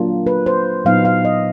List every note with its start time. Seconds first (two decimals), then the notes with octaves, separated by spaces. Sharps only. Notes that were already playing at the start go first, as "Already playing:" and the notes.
Already playing: F#3 A#3 D4 F4
0.27 B4
0.46 C5
0.85 A#2 F#3 B3 D#4 F5
1.05 F5
1.25 D#5